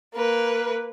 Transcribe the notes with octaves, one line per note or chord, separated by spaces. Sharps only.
A#3 B4